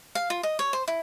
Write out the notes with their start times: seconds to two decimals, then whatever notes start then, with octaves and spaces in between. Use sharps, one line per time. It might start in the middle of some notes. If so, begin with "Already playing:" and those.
0.15 F5
0.30 F4
0.43 D#5
0.59 C#5
0.73 C5
0.88 E4